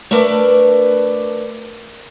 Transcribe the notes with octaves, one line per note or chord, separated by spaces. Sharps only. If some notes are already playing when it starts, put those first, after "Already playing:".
A3 D4 A#4 B4 D5